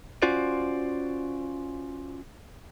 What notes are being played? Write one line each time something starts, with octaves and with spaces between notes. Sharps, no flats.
C#4 F4 F#4 C5 D5